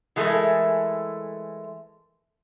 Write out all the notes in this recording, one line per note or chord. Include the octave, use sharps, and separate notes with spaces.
E3 G#3 A3 A4 A#4